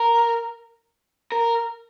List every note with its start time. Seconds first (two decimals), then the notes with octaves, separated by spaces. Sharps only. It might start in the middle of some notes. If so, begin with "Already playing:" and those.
Already playing: A#4
1.32 A#4